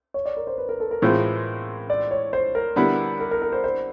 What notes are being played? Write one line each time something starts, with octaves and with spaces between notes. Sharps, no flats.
C#5
D5
A#4
C5
B4
A#4
A4
A#4
A2 E3 G#3 C4 F4
D5
C#5
C5
A#4
D3 G3 B3 E4
A#4
A#4
A#4
C5
C5